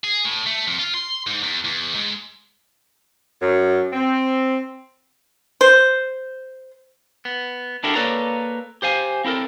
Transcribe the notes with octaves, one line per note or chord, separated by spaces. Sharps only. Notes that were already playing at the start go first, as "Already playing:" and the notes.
G#4
A2
A3
F2
F4
C6
G#2
E2
E2
G#2
F#2
C4
C5
B3
D4 E4 F#4 G4 A4 A#4
A#3 A4 B4 C#5 D5 A#5
G4 C5 F5 G#5
C4 E4 A4 A#4